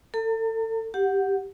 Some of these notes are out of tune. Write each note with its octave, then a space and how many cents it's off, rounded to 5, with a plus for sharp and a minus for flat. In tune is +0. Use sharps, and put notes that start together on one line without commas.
A4 +30 A#5 -40
G4 +0 F#5 -5